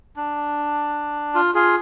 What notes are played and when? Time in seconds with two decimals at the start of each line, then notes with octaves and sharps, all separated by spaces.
0.16 D4
1.35 F4
1.55 F4 G#4